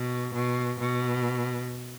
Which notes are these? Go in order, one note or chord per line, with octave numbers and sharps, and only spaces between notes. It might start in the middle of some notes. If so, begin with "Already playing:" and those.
Already playing: B2
B2
B2